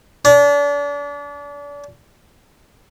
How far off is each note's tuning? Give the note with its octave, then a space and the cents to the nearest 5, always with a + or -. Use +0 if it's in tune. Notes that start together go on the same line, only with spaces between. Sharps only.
D4 -35